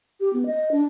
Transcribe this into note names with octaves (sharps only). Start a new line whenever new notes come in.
G4
B3
D#5
D4